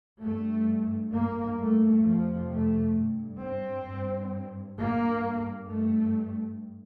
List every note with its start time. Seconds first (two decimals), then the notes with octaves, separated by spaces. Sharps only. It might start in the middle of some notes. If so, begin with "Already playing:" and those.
0.21 G2 A3
1.12 G2 A#3
1.59 A3
2.03 F2 C3 F3
2.50 A3
2.95 G2
3.41 C4
3.87 G2
4.78 G2 A#3
5.69 G2 A3